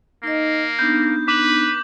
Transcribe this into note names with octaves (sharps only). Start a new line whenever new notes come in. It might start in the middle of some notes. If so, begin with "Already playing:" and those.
A#3 D#4 D#5
B3 D4 D#4 G6
B4 D6 F#7